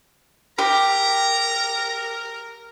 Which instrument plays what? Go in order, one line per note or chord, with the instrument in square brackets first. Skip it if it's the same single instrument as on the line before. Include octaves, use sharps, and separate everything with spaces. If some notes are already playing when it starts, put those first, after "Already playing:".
[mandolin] G4 [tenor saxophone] A#4 [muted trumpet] A#5